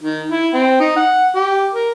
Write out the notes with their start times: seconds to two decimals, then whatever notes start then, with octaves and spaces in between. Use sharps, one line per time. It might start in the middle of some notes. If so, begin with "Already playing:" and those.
0.03 D#3
0.31 E4
0.54 C4
0.80 D#4
0.97 F#5
1.35 G4
1.73 A#4